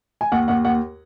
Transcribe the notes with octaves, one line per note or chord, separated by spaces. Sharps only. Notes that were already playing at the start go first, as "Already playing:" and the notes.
G#5
D#2 F#5
D#2 F#5
D#2 F#5